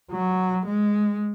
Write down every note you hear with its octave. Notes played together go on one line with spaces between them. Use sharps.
F#3
G#3